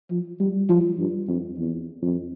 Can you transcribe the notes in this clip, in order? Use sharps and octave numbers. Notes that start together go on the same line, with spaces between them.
F3
G3
F3
G2
F2
E2
F2